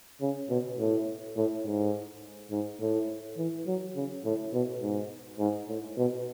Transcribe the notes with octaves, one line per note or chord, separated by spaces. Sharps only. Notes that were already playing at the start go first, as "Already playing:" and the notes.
C#3
B2
A2
A2
G#2
G#2
A2
E3
F#3
C#3
A2
B2
G#2
G#2
A2
B2